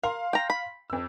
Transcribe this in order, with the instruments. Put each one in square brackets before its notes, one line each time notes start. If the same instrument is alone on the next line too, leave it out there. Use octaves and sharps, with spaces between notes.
[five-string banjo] A#4 [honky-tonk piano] F5 C6
[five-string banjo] G5 A#5
B5
[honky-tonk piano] F2 E6